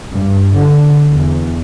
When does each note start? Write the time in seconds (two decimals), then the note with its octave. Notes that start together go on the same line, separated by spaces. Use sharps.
0.15 G2
0.56 D3
1.12 E2